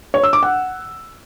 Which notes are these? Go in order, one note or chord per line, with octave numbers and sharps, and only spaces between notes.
C#5
E6
D6
F#5